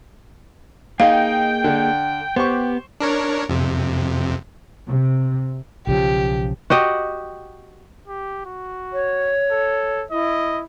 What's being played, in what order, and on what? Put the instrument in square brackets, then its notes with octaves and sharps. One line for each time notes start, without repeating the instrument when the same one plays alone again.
[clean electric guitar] A#3 G#4 D#5 [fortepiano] D#4 [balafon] F5 [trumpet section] G5
[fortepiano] D3
[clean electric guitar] B3 [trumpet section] G4 [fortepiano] C5 C#6
[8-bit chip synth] D4 A#4 C#5
F2 C3
[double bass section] C3
[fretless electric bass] B1 C#3 F3 [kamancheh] G4
[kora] F#4 G4 D#5
[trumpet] G4
F#4
[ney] C#5
[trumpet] A4
[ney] E4 [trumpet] D#5